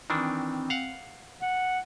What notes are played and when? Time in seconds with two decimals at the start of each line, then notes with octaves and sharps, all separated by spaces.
0.10 D#3 E3 C4 D4
0.70 F5 F#5
1.42 F#5